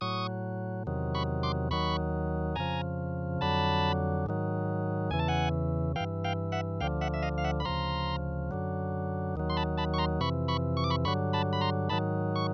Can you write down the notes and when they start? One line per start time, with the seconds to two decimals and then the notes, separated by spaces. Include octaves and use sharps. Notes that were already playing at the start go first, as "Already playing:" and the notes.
0.01 A2 F#3 C#6 D#6
0.87 E2 C3 D#3 F#3
1.15 B5 C#6
1.43 C6 D6
1.71 D#2 D#3 F#3 B5 C#6
2.56 F2 C#3 F3 G#5 A#5
3.41 F2 D3 F#3 A5 B5
4.26 G#2 D#3 F#3
5.10 E2 C#3 E3 G#5
5.19 A5
5.28 F#5 G#5
5.96 G2 E3 F5 G5
6.24 F5 G5
6.52 E5 F#5
6.81 D2 D3 F3 F5 G5
7.01 E5 F#5
7.14 E5
7.23 D#5 F5
7.38 F5
7.44 E5 F#5
7.60 B5
7.65 D2 C#3 F3 A#5 C6
8.51 F#2 D3 F#3
9.36 D#2 D#3 F#3
9.50 C6
9.57 A5 B5
9.78 A5 B5
9.94 C#6
9.98 A#5 C6
10.21 F2 C3 E3 B5 C#6
10.48 B5 C#6
10.77 C#6
10.84 D6
10.90 B5 C#6
11.05 G2 D3 F#3 B5 C#6
11.33 A5 B5
11.53 B5
11.61 A#5 C6
11.89 G#2 D#3 F#3 A5 B5
12.36 C#6